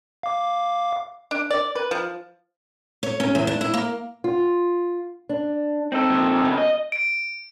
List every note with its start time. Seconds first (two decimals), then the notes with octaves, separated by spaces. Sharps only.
0.23 F5 D6
1.31 D4
1.50 D5
1.75 B4
1.91 F3
3.03 C#5
3.20 C#4
3.35 E2
3.47 D4
3.61 E4
3.74 A#3
4.24 F4
5.29 D4
5.92 C4 D#4 A4
6.10 A#2 F3
6.42 C#3 B3
6.58 D#5
6.92 D7